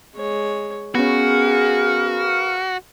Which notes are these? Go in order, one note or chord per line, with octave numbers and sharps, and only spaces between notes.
G#3 C#5
B3 C#4 F#4 G#4 A#4 B4 F5